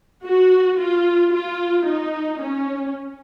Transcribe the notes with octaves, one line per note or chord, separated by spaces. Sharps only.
F#4
F4
F4
D#4
C#4